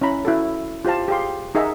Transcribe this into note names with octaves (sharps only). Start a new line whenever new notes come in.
C#4 E4 A#5 B5
E4 F#4 A4
F4 G4 C5 F5 A5
G4 G#4 F5 C6
D#4 G#4 A#4 E5 F#5 A#5